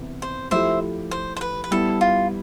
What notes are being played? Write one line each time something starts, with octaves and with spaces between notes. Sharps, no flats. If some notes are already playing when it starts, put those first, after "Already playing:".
Already playing: C3 E3 B3
C5
F3 A3 E4 G4 C5 E5
C5
C5
B4
B4
G3 B3 E4 A4
F4